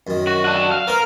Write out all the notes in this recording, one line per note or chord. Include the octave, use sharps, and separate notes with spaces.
F#2 D#3
F#4
D4 F#4
F5
B3 A#4 C5